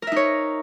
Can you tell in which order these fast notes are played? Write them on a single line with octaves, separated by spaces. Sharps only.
A#4 E5 D#4 C#5